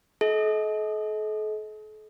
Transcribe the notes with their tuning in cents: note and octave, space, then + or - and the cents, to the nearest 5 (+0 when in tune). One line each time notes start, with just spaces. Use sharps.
A4 -40 D#5 +30